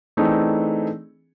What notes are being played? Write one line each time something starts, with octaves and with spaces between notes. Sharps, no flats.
E3 A3 C4 D4 D#4 G#4